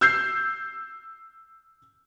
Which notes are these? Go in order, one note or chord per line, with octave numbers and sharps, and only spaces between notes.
E6 G6 C7